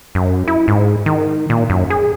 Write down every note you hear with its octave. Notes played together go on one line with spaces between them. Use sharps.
F#2
E4
G#2
D#3
A#2
F#2
G#4